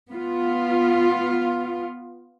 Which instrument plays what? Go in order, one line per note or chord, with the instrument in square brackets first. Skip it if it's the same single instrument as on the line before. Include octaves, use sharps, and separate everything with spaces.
[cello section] B3 F4